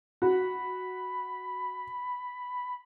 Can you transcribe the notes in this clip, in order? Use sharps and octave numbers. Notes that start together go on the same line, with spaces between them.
F#4 B5